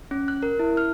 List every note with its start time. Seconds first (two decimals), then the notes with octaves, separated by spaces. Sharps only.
0.11 C#4
0.28 F#6
0.43 A#4
0.59 E4
0.77 F6